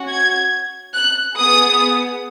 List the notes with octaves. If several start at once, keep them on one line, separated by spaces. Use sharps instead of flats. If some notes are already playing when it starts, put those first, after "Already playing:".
Already playing: C#4 F#4
G#6
F#6
B3 G#4 D#6